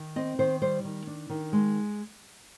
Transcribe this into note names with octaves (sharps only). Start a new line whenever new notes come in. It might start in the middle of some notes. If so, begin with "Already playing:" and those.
Already playing: D#3
C4 D#5
D#3 C5
G3 C5
D#3
D4
D#3
G#3